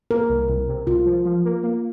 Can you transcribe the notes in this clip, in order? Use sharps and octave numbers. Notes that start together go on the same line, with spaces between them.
A#3 A#4
C2
C2
C3
C2 F4
F3
F3
A#3
A#3